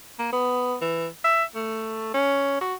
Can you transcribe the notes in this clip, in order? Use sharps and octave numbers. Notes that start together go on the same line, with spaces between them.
A#3
B3
E3
E5
A3
C#4
F#4